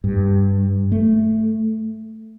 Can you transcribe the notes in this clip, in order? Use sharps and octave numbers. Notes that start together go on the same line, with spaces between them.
G2
A3